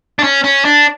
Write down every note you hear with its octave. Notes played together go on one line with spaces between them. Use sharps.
D4
C#4
C#4
D4